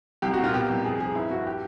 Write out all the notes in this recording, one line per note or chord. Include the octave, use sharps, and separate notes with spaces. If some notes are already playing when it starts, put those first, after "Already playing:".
C2 G4
F#4
A#2
F4
B2 G4
C2
F2 G#4
F3 G#4
G2 E4
G2 F#4
G4